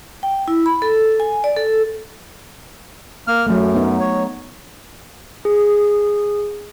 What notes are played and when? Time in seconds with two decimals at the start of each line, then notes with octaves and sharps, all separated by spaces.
0.23 G5
0.48 E4
0.66 B5
0.82 A4
1.20 G#5
1.44 D5
1.57 A4
3.27 A#3 F6
3.47 F#2 F#3 A3
3.74 B3 D#4
4.00 C#5
5.45 G#4